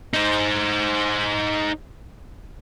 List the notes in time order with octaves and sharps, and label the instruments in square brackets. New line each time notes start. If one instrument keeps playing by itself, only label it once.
[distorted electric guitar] D#4 C5